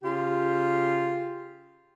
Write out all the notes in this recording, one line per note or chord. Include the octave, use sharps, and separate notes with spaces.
C#3 F4 G4